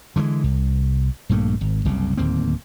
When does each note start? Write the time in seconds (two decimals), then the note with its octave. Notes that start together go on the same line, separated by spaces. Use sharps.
0.16 D3 E3 F3 G#3
0.44 C2
1.29 A#1 G2 A3 A#3
1.61 G#1
1.85 F#1 C2 C#3
2.18 D1 D#2 A#3 C4